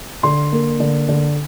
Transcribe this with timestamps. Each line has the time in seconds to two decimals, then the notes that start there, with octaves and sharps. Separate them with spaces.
0.23 D3 C6
0.52 A#3
0.80 D3
1.09 D3